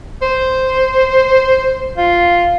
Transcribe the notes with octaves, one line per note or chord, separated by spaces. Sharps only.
C5
F4